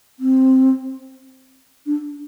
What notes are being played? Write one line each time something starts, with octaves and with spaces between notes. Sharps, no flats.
C4
D4